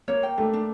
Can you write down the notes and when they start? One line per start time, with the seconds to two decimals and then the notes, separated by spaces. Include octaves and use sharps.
0.08 A#3 C#5
0.23 G5
0.38 A3 D4
0.53 D4